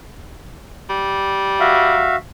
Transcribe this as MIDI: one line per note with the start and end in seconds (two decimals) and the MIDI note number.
0.90 2.13 55
1.60 2.16 66
1.60 2.16 76
1.60 2.16 77